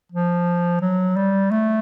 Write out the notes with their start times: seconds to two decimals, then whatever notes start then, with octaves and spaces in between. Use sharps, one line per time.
0.12 F3
0.81 F#3
1.16 G3
1.51 A3